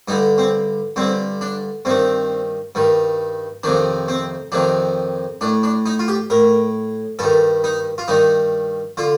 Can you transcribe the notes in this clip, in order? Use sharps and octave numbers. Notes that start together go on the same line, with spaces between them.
G2 D3 D#4
C4
G2 D3 C4
D4
G2 D#3 C4
G2 D#3
F2 C3 D#3 D4
C4
F2 C3 D#3 D4
A2 D4
D4
D#4
F4
G4
A2 A#4
G2 D#3 A4
D#4
F4
G2 D#3 D#4
D3 F4